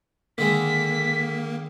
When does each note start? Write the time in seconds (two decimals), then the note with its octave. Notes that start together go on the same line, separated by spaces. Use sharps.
0.38 D3 D#3 G#3 A#3 B6